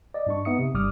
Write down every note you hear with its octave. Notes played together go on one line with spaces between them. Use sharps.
D5 D#5
G2 D4 C#6
B3 D#4 E5 D#6 C#7
C3
G1 G2 G3 D6 D#6 F6